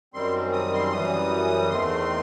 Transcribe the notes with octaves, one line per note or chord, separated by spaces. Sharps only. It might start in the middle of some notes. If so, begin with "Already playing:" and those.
F#2 D#3 G3 C4 C6
D#6
C6
F#2 E3 G3 D#6
E2 D#3 A3 C4 C6